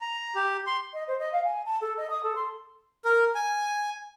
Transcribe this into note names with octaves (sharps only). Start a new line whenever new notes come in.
A#5
G4
C6
D#5
C5
D#5
F5
G#5
A5
A4
D#5
D#6
A4
C6
A#4
G#5